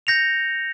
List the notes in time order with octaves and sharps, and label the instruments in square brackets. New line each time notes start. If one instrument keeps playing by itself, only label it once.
[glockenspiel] G6 A#6 C#7 F7